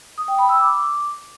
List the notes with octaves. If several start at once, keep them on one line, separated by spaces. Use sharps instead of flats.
D#6
G5
B5
E6
D6